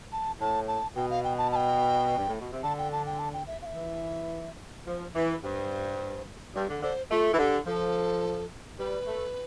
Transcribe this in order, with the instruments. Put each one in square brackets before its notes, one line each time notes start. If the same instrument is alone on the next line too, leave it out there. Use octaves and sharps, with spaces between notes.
[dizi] A5
[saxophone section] A2 [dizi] A5
[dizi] A5
[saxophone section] B2 [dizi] G5
[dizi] F5
G5
A5
A5
G5
[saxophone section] G2
A2
B2
C3
[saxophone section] D3 [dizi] A5
[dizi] G5
A5
G5
A5
G5
E5
F5
E5
[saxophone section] E3
[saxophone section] F3 [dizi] C5
[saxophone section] E3 [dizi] B4
[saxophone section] G2 [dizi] C5
[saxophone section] G2
D3
[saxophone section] D3 [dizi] C5
[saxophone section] A3 [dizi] F4
[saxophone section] E3
[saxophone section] D3 [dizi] G4
[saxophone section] F3 [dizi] A4
[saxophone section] G3 [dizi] B4
[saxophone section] A3